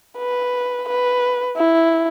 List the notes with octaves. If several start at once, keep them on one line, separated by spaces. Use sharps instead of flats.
B4
B4
E4